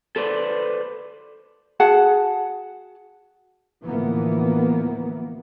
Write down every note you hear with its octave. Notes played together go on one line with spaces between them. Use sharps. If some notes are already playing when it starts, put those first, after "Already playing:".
A4 B4 C5 D5
F#4 G#4 F#5 A5
D2 A2 E3 F3 A#3 B3